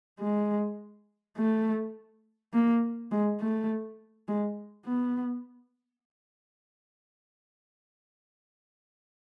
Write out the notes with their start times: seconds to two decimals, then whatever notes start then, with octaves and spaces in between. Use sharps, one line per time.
0.19 G#3
1.37 A3
2.53 A#3
3.12 G#3
3.41 A3
4.28 G#3
4.86 B3